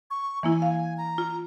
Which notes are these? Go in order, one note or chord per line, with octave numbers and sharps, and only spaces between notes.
C#6
E3 A#3 E4 G#5
F5
A#5
F4